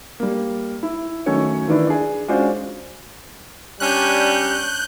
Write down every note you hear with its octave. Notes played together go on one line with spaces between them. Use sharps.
G3 A#3
E4
D#3 F#3 A3 C#4 D#4 C#5
D#3 E3 D4 E4
D4 G#4
G#3 C#4 D4 F4 F#4 C5
G3 C#4 D4 F#6 G6